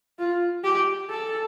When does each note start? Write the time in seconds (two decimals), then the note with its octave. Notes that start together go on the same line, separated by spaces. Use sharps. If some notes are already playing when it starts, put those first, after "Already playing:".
0.19 F4
0.64 G4
1.10 A4